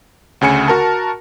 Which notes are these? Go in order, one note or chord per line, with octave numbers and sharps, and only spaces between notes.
D2 C#3 G#5 C#7
F#4 A#4 A5